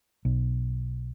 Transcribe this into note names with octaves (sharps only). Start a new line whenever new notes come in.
B1